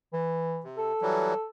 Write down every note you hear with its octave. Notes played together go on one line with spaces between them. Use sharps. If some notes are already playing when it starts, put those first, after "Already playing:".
E3
C3
A4
E3 F#3 G3